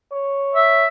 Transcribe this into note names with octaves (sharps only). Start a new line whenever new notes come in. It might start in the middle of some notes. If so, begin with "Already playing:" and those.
C#5
E5